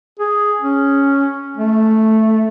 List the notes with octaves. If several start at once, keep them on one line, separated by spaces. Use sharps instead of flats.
G#4
C#4
A3